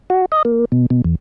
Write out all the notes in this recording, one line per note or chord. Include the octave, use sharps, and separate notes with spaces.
F#4
D#5
A#3
B2
B2
E2